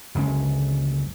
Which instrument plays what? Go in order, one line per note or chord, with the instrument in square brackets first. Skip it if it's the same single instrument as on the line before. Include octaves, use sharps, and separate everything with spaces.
[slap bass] F#1 C#2 D3 C#4